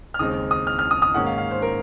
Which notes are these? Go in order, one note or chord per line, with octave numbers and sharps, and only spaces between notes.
F6
D#2 C#3 G#3 C4 D#4 D#6
D#6
F6
F6
D#6
D#6
G#2 D#3 A#3 C#4 F#5
F5
F5
C5
A#4